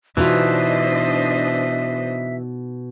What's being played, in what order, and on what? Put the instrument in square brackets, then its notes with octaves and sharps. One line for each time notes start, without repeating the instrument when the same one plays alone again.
[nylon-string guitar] B2 D#4 F4 [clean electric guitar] E3 [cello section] D4 C5 D#5 [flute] E5